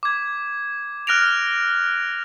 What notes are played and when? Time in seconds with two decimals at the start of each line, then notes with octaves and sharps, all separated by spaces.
0.03 D6 G#6
1.07 F6 F#6 A#6 D7 F7